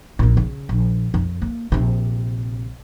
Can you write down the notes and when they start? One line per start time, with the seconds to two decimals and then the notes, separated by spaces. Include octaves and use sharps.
0.19 A#1 A#2
0.37 C#3
0.69 A#1
1.14 F2
1.42 A#3
1.72 A#1 C3